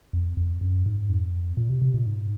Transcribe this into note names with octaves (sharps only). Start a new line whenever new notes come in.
F2
F2
F#2
G#2
F2
A#2
C3
C3
A#2
G#2